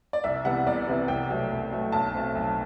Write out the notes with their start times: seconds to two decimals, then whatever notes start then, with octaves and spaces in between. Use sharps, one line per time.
0.13 D5
0.24 C2 E5
0.45 C3 E3 G3 B3 F#5
0.66 C2 D5
0.87 C3 E3 G3 B3
1.08 C2 G5
1.30 B2 F#3 A3
1.51 C2
1.72 B2 F#3 A3
1.92 B1 A5
2.15 B2 A3 C4
2.35 B1